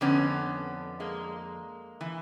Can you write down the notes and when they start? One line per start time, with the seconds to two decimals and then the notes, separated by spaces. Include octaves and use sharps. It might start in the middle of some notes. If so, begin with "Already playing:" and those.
0.01 F2 D3 B3 C#4
1.00 G#3 A#3
2.01 E3